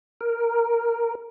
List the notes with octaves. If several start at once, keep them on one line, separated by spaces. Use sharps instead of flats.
A#4